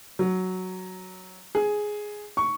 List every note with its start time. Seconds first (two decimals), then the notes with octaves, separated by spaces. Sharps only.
0.19 F#3
1.55 G#4
2.37 C#6